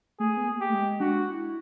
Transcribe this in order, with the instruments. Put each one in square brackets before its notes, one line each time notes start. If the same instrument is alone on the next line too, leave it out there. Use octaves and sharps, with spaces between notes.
[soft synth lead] A3 [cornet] G#4
[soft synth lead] B3
A#3
[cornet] G4
[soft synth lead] A3
G#3
[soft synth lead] D4 [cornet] F#4
[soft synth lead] E4